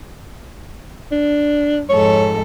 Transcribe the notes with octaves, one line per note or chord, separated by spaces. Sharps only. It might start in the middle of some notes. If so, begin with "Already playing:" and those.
D4
F2 G#2 A4 C#5